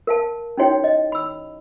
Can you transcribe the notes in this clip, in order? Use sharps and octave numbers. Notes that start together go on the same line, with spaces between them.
A#4 F5 A5
C#4 D#4 E4 F#4 C#5 G5
D#5
B5 E6